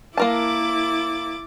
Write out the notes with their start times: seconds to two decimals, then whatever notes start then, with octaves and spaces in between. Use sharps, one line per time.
0.17 A#3 E4 A#4 A5 D6 A6